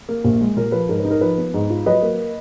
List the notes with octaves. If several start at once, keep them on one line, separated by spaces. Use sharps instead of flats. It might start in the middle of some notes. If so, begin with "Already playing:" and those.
A#3
A#1
G#3
A#2 A#4
F3 B4
G#2 A#4
B4
D#4
A#4
F3 B4
B3
G#2
F4
F#3 B4 D#5
A#3